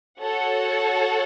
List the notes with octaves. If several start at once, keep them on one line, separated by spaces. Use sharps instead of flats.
F#4 A4 C#5 F#5